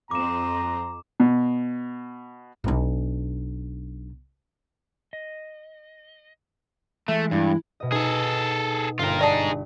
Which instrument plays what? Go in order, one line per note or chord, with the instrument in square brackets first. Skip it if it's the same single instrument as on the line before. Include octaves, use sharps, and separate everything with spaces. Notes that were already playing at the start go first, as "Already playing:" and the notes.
[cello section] F2 C4 [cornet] A#5 [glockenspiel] D6 E7
[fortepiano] B2
[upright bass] B1 D4
[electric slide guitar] D#5
[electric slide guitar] E3 G#3 [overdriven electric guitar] A3 [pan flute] E5
[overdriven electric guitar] G2 [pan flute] E4
[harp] B2 D#5
[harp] D#4 [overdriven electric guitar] G#4 A4
[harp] G1 [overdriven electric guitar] F4 A#4
[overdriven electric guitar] D#4 G#4 [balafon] D5 A5